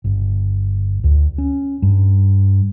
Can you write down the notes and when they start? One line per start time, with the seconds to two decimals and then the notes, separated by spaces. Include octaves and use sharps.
0.04 G1
1.04 D2
1.38 C#4
1.82 G2